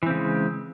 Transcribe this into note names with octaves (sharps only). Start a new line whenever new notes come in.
C#3 E3 G#3 C4